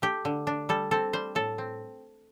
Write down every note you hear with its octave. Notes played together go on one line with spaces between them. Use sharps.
A3 G4
D3
D4
G3 A4
C4 A4
G3 C5
A2 A4
C4